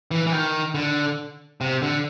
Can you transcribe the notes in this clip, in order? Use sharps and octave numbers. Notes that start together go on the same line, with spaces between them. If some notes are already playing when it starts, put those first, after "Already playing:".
E3
E3
D#3
D3
C3
D3